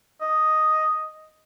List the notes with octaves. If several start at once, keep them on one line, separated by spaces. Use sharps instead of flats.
D#5